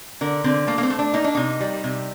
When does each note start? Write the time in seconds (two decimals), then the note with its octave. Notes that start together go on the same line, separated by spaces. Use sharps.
0.21 D3 A#4
0.44 D3 C4
0.67 A3 A#3
0.78 A#3
0.83 C4
0.90 A3
0.99 D4
1.14 A#3 D#4
1.24 D4
1.35 C3 D#4
1.61 G3
1.84 C3